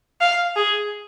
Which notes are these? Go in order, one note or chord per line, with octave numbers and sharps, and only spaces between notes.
F5
G#4